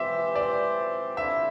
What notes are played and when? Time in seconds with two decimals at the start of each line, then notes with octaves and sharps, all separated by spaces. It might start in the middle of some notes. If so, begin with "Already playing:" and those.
Already playing: E3 C4 G4 C5 E5
0.35 D5
1.17 D3 C4 E4 C5 E5